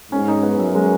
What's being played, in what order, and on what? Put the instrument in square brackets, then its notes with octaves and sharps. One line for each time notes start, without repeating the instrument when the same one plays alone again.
[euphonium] G#2 [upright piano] C#4
[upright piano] D#4
B3
[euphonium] F#2 [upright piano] F#3
[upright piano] G#3